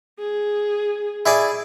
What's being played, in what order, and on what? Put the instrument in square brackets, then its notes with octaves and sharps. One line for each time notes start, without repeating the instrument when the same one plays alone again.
[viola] G#4
[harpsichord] E4 G#4 D5